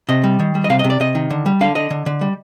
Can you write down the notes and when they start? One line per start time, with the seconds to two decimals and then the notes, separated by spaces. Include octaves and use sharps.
0.09 C3 D#5
0.24 G3
0.39 D#3
0.55 G3
0.64 D#5
0.70 C3 F5
0.79 D#5
0.84 C3
0.90 D5
1.00 C3 D#5
1.15 D#3
1.30 D3
1.46 G3
1.61 D3 F5
1.75 D3 D#5
1.90 D3
2.06 D3
2.21 G3